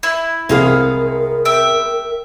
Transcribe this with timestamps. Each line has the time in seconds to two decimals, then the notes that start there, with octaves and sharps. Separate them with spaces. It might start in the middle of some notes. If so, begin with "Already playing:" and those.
0.03 E4
0.49 C2 G#3 B3 G#4 A#4 F5
1.45 E5 G5